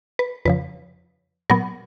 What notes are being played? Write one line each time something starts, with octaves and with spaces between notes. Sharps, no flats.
B4
F2 C#3 F3 B4
A#2 F#3 B3 A#4